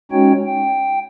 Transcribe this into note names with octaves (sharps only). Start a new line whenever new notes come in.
G#3 C#4 D#4 F#4 C#5 G5
G5